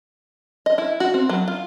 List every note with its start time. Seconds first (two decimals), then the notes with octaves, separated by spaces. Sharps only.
0.66 D#5
0.78 E4
1.00 F#4
1.14 C4
1.29 F#3
1.48 F4